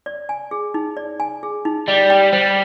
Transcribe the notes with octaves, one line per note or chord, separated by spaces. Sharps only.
D5
G#5
G#4
D#4
D5
G#5
G#4
D#4
G3 D#5
G5
G3 C5